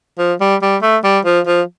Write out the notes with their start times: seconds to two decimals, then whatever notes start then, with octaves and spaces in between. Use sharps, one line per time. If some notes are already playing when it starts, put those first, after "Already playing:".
0.18 F3
0.41 G3
0.62 G3
0.82 A3
1.04 G3
1.25 F3
1.47 F3